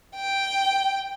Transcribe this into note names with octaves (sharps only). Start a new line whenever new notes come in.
G5